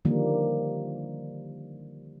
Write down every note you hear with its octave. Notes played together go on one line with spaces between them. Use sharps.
D3 D#3 F3 G3 A#3